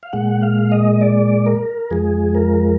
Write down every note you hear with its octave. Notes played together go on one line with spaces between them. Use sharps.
F5
A#2 G#3 F#5
F5
D#5
D5
A#4
F2 F3 G#3 G#4
A#4